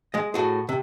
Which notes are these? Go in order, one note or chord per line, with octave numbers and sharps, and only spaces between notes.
G#3 D#5
A2 F#4 G#4
C3